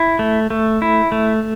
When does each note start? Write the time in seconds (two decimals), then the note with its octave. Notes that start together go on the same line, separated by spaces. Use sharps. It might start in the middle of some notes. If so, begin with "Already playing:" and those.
Already playing: E4
0.19 A3
0.50 A3
0.82 E4
1.12 A3